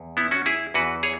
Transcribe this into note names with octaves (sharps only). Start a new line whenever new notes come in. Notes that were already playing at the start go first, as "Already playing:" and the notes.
Already playing: E2
B3 E4
C#4 F#4
E4 G#4
E2 E3 F#4 B4
G#4 C#5